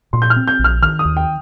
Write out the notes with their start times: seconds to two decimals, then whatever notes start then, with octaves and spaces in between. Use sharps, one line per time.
0.13 A#2 C6
0.22 G6
0.30 F6
0.36 C4
0.48 G6
0.59 A#1
0.64 F6
0.83 D#3 F6
0.99 D#6
1.05 D#2
1.17 G5